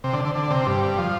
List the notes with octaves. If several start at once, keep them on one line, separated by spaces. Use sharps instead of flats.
C3
D3
D3
D3
C3
G2
F3